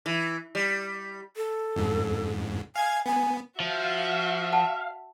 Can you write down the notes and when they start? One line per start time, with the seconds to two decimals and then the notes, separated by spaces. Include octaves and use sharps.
0.06 E3
0.55 G3
1.36 A4
1.76 F2 G#2
2.76 F5 G#5 G#6
3.06 B3 G#5
3.60 F3 F#4 E5 F5
4.52 F#5 A5